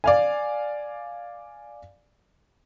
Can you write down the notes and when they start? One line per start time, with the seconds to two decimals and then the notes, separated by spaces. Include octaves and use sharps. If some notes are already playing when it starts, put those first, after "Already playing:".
0.04 D5 F5 G#5